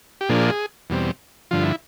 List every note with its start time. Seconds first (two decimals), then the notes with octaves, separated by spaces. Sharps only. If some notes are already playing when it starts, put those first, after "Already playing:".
0.21 G4
0.29 A#2 F3 A#3 D4 G#4
0.90 E2 B2 G3 C4
1.51 G2 D3 F3 F4
1.63 E4